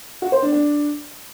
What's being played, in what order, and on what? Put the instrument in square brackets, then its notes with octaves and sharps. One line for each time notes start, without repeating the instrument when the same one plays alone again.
[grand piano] F#4
C5
D4
D4